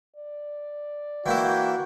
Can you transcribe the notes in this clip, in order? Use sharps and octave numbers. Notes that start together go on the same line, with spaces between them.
D5
E3 A#3 E4 F#4 G5